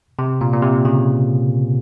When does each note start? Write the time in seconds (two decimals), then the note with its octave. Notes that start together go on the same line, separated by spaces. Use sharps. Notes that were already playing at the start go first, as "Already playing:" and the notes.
0.19 C3
0.41 A#2
0.53 A#2
0.62 C3
0.85 C#3